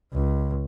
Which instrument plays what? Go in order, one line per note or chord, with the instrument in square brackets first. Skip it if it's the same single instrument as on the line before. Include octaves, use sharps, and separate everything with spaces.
[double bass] C#2